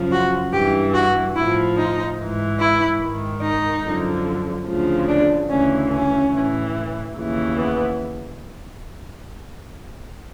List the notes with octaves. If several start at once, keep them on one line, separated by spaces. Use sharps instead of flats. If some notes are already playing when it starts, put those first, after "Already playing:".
Already playing: F#2 C#3 F3
F#4
G2 E3 G4
F#4
A2 F3 E4
D#4
G#2 E3
E4
G#2 D#3
D#4
F#2 D3 F3
D2 C#3 F3
D4
D2 C#3 E3 C#4
C#4
A2 E3
D#2 C#3 E3
B3